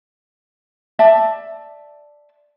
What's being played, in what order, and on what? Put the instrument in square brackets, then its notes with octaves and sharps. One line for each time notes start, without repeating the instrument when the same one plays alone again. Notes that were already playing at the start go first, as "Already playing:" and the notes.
[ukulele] D5 E5 A5